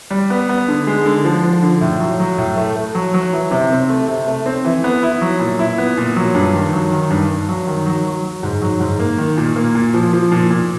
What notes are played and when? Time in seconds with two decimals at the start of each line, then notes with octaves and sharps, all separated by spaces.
0.11 G3
0.30 B3
0.49 B3
0.68 D3
0.87 G#3
1.05 D3
1.25 F3
1.43 F3
1.62 D3
1.81 A2
2.00 F#3
2.20 F#3
2.38 A2
2.57 A3
2.76 A3
2.95 F#3
3.14 F#3
3.33 E3
3.51 C3
3.70 C4
3.89 A3
4.08 C3
4.27 A3
4.46 C4
4.65 E3
4.84 B3
5.03 E4
5.21 F#3
5.40 A#2
5.59 E4
5.78 B3
5.97 A#2
6.16 F#3
6.35 G2
6.54 D#3
6.73 F#3
6.91 D#3
7.11 G2
7.29 G2
7.49 F#3
7.67 D#3
7.86 F#3
8.05 F#3
8.24 F#3
8.43 G#2
8.61 F#3
8.80 G#2
8.99 A#3
9.18 D#3
9.37 A#2
9.56 A#3
9.75 A#2
9.94 F3
10.13 F3
10.32 A#2
10.50 A#2